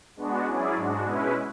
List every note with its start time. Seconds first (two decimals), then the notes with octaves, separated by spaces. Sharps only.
0.17 G#3 B3 D4 F#4
0.45 F#3 C#4 E4 G#4 D5
0.76 G#2 G#3 D4 F#4
1.04 B2 G#3 C#4 E4 B4